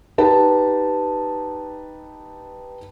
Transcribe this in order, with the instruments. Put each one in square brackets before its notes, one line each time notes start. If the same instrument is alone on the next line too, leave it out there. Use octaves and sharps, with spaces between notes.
[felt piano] D#4 G4 B4 A5